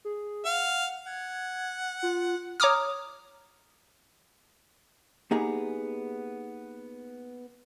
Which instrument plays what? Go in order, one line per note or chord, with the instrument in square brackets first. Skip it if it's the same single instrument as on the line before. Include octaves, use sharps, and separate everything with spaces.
[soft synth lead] G#4
[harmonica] F5 [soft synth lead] F#5
[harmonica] F#5 [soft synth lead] G#6
[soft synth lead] F4
[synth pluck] C#5 A#5 D6 D#6 F6
[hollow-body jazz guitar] A#3 B3 D#4 G4 G#4 A#5